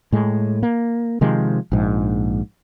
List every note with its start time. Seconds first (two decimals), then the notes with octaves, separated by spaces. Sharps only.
0.12 A2 G#3
0.63 A#3
1.21 C3 D#3 F3 G#3
1.72 A#1 G#2